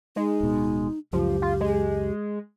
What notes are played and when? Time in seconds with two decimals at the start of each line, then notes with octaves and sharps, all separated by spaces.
0.16 G#3 D#4
0.40 D1 B2
1.13 C#2 F#2 F3 G4
1.42 F4
1.61 G#3